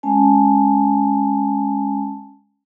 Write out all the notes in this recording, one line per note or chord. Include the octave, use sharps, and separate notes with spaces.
G#3 C#4 G#5 A5